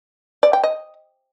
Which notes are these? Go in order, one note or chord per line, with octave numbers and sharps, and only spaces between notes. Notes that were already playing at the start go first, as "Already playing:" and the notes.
D5
G5
D#5